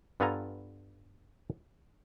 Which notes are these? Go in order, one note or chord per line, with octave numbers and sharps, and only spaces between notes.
G2 B3 F4 A4 G#5 A#5